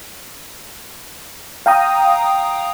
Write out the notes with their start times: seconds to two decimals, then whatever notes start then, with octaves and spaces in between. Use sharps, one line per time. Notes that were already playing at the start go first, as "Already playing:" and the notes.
1.66 F5 G5 A#5 D#6